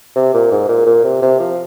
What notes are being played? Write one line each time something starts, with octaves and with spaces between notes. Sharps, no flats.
C3
A#2
G#2
A#2
A#2
C3
C3
F3